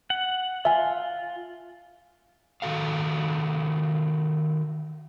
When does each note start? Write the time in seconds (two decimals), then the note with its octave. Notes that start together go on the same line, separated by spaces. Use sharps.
0.10 F#5
0.65 F4 E5 G#5
2.62 D#3 F#4 A4 F5